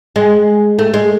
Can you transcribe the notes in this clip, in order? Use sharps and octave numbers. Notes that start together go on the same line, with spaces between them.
G#3
A3
G#3